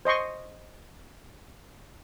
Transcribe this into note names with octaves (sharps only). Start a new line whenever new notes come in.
C5 D#5 C6 C#6